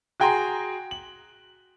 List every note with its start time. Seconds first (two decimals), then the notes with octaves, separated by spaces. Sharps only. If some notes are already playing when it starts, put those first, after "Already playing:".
0.20 F#4 G#4 G5 G#5 A#5 C6
0.91 F#7